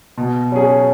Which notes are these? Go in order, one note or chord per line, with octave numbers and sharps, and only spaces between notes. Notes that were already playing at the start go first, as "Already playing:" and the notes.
B2
F#3 C#4 G#4